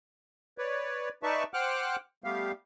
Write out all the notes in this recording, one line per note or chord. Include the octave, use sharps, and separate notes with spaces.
B4 C#5 D5
D#4 B4 D5 E5 A5 C#6
C5 F#5 G5 D6 F6 F#6
G3 A3 B3 G4 F5